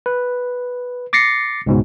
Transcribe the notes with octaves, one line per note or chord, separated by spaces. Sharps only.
B4
D6 A6 A#6 C7 C#7
C#2 G#2 B2